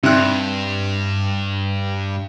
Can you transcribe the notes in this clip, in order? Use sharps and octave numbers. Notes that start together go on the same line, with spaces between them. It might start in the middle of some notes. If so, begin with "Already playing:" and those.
G2 C3 F#6